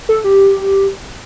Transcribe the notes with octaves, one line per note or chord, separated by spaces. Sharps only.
A4
G4